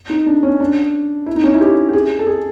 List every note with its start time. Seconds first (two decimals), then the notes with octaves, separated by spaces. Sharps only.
0.10 D#4
0.26 D4
0.43 C#4
0.60 D4
1.26 E4
1.36 D#4
1.44 C#4
1.53 E4
1.61 G4
1.89 G4
1.93 G#4
2.19 A4
2.27 G#4